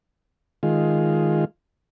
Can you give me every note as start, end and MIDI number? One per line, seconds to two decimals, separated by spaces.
0.63 1.45 51
0.63 1.45 56
0.63 1.45 65